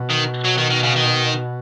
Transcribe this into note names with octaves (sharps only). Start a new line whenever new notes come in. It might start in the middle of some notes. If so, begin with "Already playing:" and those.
Already playing: B2
D#3
F#3
D#3
D#3
C#3
D#3